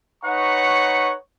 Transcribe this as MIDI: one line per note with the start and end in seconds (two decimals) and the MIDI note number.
0.24 1.13 63
0.24 1.13 71
0.24 1.13 73
0.24 1.13 78
0.24 1.13 82
0.24 1.13 85